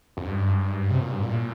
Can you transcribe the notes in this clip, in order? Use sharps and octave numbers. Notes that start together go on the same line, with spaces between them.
F2
G2
C3
A#2
G2
A#2